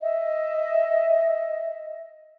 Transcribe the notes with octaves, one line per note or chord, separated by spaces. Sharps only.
D#5 E5